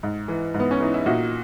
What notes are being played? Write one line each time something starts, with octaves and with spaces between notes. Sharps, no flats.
G#2
E3
G#2
B3
C#4
E3 D#4
E4
A#2 D#4 F#4